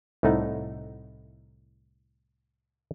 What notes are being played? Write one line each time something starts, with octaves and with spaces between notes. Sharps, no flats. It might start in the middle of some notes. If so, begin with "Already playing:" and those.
C2 A2 A3 D#4 F#5